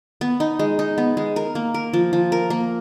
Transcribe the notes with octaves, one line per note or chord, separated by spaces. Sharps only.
B3
D#4
G#3
D#4
B3
G#3
A#4
A#3
A#4
F3
F3
A#4
A#3